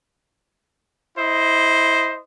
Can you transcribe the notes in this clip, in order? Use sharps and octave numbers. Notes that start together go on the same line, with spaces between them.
E4 C5 D#5